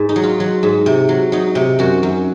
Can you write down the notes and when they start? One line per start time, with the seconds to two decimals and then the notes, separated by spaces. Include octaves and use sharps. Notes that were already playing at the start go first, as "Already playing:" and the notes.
Already playing: G#2
0.09 D#4
0.16 F#3
0.23 F4
0.40 F#3
0.63 G#2
0.86 C3
1.09 F#3
1.32 F#3 D#4
1.55 C3
1.79 F#2 F#4
2.03 F#2